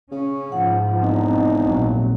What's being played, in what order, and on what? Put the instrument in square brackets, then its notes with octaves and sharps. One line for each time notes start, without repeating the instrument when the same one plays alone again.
[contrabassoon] C#3 [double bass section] C#4
[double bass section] G#2 F3 [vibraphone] F#5
[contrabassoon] E1 [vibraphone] C4 [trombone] D#4
[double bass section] A#1 A#2 F#3